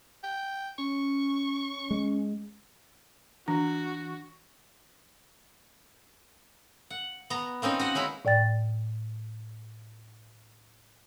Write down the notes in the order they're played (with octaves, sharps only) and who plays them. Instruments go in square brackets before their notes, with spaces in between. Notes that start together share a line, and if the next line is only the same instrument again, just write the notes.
[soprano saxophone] G5
[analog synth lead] C#4 [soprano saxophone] C#6
[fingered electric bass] G#3
[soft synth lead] E3 [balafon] D4 [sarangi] F#4
[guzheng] F#5
B3 A#5
A#3 C4 C#4 D#4
F#4 D#5 F#5
G#3 C#4 E4 B5
[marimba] A2 D5 G5 A6